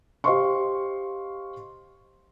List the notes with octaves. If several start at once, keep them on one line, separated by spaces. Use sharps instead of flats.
G4 C5 D#5 F5 C6 C#6